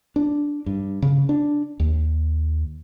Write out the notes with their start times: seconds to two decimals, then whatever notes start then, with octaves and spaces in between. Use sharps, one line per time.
0.16 D4
0.66 G2
1.02 C#3
1.29 D4
1.80 D#2